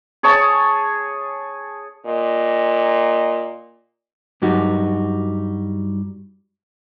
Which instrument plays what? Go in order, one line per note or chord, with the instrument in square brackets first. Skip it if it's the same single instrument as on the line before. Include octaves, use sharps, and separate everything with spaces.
[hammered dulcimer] G#4 C#5 A5
[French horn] A#2 [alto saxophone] D#5
[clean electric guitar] G2 F#3 G3 D#4 F#4